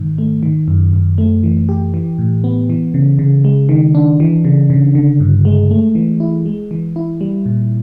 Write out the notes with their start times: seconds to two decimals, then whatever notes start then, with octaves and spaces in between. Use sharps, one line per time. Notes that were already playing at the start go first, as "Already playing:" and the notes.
Already playing: G#2 D#3
0.18 A3
0.43 D#3
0.68 F#2
0.93 F#2
1.18 A3
1.43 E3
1.69 G4
1.94 E3
2.18 A2
2.44 B3
2.70 E3
2.94 C#3
3.19 C#3
3.44 G#3
3.69 D#3
3.95 D4
4.20 E3
4.45 C#3
4.70 C#3
4.95 D3
5.20 G2
5.45 G#3
5.71 A3
5.95 E3
6.20 E4
6.46 G#3
6.71 E3
6.96 E4
7.21 G3
7.46 A#2